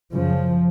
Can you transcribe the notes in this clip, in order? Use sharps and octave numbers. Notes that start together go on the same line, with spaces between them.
F#2 C#3 F3